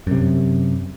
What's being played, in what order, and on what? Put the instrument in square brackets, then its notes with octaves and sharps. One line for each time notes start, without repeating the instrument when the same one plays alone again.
[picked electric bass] F#2 C3